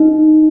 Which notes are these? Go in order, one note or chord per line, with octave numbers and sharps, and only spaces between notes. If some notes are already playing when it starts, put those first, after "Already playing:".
Already playing: D#4